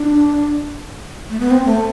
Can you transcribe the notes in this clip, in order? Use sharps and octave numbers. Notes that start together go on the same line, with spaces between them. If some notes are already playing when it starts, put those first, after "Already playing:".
Already playing: D4
A3
B3
C4
A3